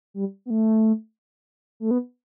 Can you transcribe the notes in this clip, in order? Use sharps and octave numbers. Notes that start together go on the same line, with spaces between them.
G3
B3
A3
A3
B3